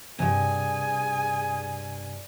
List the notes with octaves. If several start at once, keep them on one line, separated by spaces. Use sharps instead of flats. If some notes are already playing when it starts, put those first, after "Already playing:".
E2 G2 C3 G#4 G#5